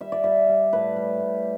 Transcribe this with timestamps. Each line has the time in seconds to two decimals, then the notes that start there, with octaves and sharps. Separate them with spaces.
0.01 G3 E5
0.12 D5
0.24 G3 E5
0.49 G3
0.73 A2 B4
0.96 G3
1.20 A2